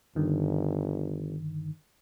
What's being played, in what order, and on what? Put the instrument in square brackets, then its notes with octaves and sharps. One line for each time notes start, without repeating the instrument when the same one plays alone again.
[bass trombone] G1 [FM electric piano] G2 D3 D#3